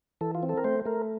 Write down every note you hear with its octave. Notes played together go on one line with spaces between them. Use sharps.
E3 A4
F4
C4
A4
A#4
A3 C5
A3 A#4